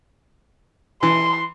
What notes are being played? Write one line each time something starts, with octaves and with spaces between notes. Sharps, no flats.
E3 C6